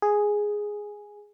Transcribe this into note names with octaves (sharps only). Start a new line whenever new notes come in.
G#4